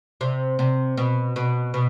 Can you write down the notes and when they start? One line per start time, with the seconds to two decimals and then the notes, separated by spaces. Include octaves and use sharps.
0.21 C3
0.59 C3
0.98 B2
1.36 B2
1.74 B2